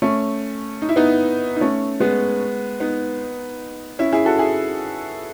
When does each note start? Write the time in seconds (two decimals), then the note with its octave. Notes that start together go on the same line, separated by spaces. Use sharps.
0.02 A3 C#4
0.82 D#4
0.89 E4
0.96 B3 D#4
1.56 D#4
1.61 A3 C#4
2.00 G#3 B3
2.80 B3 D#4
3.99 C#4 E4
4.12 E4 G#4
4.25 F#4 A4
4.39 E4 G#4